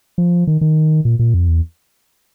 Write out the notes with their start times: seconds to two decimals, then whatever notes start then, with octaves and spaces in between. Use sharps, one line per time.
0.18 F3
0.47 D#3
0.61 D#3
1.05 A#2
1.19 A#2
1.34 F2
1.48 E2